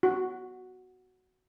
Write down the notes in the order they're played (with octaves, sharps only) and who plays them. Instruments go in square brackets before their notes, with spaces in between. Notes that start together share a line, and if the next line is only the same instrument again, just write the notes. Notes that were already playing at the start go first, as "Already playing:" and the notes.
[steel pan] F#4